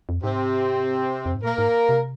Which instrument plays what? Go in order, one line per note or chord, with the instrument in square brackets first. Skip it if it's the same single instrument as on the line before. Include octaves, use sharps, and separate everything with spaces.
[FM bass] F2
[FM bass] G#2 [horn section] C3 C4
[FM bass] F2
G#2
[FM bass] A#2 [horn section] A#3 A#4
[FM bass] G#2
C3